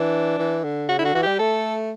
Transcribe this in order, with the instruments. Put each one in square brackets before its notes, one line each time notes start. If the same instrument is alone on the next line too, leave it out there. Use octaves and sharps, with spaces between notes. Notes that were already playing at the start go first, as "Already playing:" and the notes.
Already playing: [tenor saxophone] E3 [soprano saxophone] D4
[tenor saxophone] E3
D3
[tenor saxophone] C#3 [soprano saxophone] F#4
[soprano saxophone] E4
[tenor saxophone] D3 [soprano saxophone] F#4
[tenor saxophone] E3 [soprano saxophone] F#4
[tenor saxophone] G3 [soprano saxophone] G4
[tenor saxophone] A3 [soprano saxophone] A4